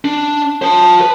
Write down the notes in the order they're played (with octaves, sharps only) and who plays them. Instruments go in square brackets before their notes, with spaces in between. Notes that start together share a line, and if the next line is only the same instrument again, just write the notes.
[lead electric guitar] D4
C5 A5
B4